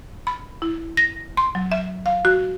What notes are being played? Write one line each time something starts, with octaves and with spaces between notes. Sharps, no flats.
B5
E4
A#6
C6
F#3
E5
F5
F#4